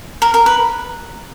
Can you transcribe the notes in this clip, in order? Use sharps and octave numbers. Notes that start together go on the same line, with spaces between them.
A#4
A#4
B4